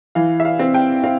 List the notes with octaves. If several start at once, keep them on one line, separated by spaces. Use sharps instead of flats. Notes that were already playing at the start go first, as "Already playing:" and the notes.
E3 F5
E5
F5
C4
G5
C4 F5